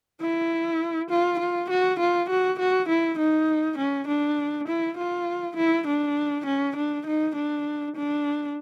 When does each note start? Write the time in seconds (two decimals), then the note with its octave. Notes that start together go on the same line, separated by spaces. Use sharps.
0.21 E4
1.10 F4
1.39 F4
1.70 F#4
1.99 F4
2.29 F#4
2.59 F#4
2.88 E4
3.18 D#4
3.78 C#4
4.07 D4
4.68 E4
4.97 F4
5.57 E4
5.87 D4
6.46 C#4
6.76 D4
7.06 D#4
7.35 D4
7.96 D4